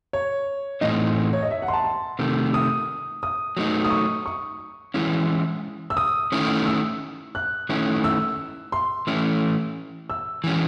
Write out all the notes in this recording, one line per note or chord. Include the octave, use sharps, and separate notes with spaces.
C#5
A2 E3 A3 C4 D#4 D#5
C#5
D#5
E5
F#5
C6
A5
C6
C3 D#3 A3
D#6
D#6
F#3 A3 D#4
D#6
C#6
C#6
E3 G#3 C#4 E4
E6
D#6
D#3 A3 C#4 E4
E6
F#6
D#3 A3 C#4 E4
E6
C6
E3 A3 C#4 E4
E6
E3 G#3 C#4